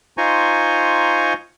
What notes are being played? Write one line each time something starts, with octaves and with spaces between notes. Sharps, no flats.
D#4 F4 C5 G#5 A#5 C#6